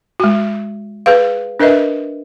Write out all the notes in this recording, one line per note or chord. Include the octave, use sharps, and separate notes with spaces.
G#3 F#4
G#4 B4 F5
D4 A#4 B4 D#5 E5